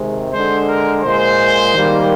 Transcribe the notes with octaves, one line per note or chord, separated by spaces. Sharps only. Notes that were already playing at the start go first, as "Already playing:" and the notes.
Already playing: C3 D#3 G#3
D3 G#3 C5
A#4
A#2 G#3 C5
D#3 G3 A#3